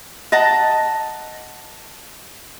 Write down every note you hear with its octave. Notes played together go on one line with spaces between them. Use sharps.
D#5 F#5 A5 A#5